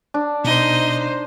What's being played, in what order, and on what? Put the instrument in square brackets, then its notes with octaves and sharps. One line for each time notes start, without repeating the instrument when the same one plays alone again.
[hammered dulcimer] D4
[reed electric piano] B2 [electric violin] D#4 C5 [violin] D#5